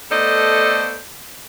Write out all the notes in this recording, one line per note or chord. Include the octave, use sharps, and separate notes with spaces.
A3 B3 A4 C5 D5 D#5